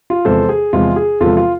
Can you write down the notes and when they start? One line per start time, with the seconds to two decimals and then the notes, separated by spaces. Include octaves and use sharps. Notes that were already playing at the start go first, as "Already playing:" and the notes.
0.10 F4
0.25 E2 C3 F3 G#3 A4 C5
0.49 G#4
0.73 E2 C3 F3 G#3 F4
0.96 G#4
1.20 E2 C3 F3 G#3 F4 A4
1.37 F4